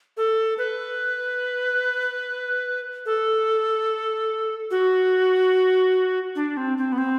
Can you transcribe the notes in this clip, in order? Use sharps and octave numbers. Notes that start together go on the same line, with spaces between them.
A4
B4
A4
F#4
D4
C4
C4
B3
C4